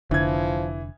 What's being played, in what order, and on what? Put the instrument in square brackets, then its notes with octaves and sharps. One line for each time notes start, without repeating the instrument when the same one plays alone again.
[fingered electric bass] F1 D3 [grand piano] E3 G#6 [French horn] F3